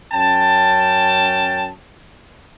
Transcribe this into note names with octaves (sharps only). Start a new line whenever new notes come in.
F#2 C#4 G5 A5